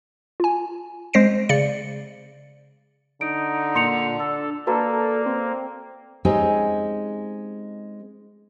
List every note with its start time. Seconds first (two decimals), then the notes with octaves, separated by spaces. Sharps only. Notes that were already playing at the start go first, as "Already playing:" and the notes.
0.40 F4 G#5
1.13 G#3 C4 C5 A#6 C7 D7
1.49 C#3 D5 C#7
3.21 D3 D#4 D7
3.75 A#2 C6 C#7 F7
4.20 D4 A4
4.67 A#3 F#4 A4 B4 D5 A#5
5.26 C4
6.25 G#3 C4 C#4 D#4 G4 G#4